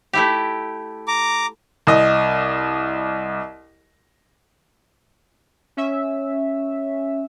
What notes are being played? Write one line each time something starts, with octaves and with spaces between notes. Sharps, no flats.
A3 E4 G4
A#5 D6
C2 D#5
C#4 E5